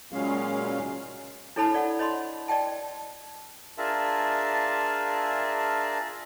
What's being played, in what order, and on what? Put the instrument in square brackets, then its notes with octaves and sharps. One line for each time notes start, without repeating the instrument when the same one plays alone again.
[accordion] A#2 C#3 F#3 G#3 C#4 F5
[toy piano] D4 E4 A4 C#5 A5 B5
D5 F#5
C#5 D#5 B5 C6
D5 D#5 G5 A5
[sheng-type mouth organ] D4 F4 G#4 A#4 E5 A5